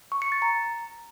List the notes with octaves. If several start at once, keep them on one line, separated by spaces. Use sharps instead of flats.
C#6
C#7
A6
A#5